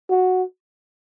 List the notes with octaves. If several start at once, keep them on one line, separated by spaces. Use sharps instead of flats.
F#4